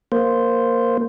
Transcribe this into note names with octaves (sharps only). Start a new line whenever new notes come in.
A#3 C5